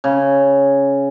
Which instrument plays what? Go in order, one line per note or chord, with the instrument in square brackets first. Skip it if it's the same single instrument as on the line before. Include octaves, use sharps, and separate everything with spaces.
[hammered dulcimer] C#3